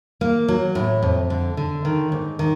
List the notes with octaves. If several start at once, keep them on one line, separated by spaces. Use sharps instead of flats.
A#3
F#3
A2
F2
D3
D3
D#3
G#2
D#3